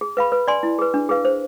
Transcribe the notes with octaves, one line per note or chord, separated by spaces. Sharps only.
G#4
B4 F5 B5
B4
D5 G#5 C6
E4
G#4 B4
D4
G#4 B4 F5
C5